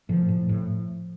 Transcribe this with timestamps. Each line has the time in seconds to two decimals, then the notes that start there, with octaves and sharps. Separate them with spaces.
0.09 A2 F3
0.29 A2
0.49 A2